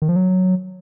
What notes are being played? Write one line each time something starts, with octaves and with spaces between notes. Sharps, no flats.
D#3
F3
F#3